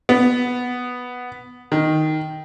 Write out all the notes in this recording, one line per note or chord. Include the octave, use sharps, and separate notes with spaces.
B3
D#3